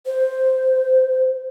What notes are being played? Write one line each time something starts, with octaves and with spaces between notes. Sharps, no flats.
C5